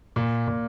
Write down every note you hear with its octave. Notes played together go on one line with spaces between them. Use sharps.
A#2
A#2